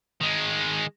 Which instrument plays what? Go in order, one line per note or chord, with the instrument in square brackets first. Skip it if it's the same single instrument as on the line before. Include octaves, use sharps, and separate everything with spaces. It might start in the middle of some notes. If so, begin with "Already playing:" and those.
[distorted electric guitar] D#3 G#3